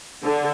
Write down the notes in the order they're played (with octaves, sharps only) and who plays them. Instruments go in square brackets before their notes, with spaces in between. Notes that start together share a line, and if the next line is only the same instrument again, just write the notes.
[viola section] D3